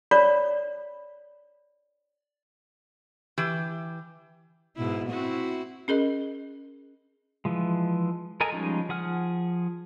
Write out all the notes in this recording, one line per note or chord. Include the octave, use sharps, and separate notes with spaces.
C#5 D5 B5
E3 G4
G#2 B2 E4
C4 E4 F#4
C#4 G#4 A#4 D#5
E3 F3 G#3
A4 A#4 D#5 G#5
F3 G3 G#3 C#4 D#4
F3 G#4 F#5 F6